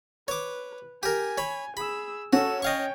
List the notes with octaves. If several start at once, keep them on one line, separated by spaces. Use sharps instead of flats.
B4 C#5 D6
G4 A#4 G#5
C#5 B5
G#4 B5 E6
C#4 F#4 A4 E6
C#5 D#5 F5 G5 C#6